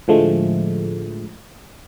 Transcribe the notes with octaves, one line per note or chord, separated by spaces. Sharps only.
A2 D3 F3 G#3 A3